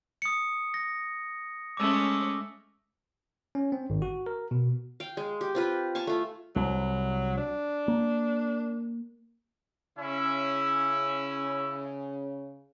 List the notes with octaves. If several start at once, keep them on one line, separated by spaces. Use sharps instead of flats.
D#6 C#7
A#6
G#3 A3 C#4 D6 E6
C#4
C4
G#1
F#4
A#4
B2
F5 G5
G#3
G4
C4 F4 B4
F5 G#5 A5 C#6
A3 F4
C2 F#3
D4
A#3
C#3 C#4 E4 E5